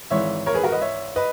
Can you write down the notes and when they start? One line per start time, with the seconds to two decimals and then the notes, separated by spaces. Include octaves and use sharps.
0.11 G#1 G#2 E3 C#5 E5
0.46 A#4 C#5
0.54 G#4 B4
0.63 F#4 A#4
0.72 B4 D#5
0.81 C#5 E5
1.16 B4 D#5